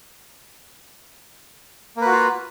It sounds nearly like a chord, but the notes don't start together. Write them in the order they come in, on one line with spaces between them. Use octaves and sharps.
A#3 B4 F#4 F4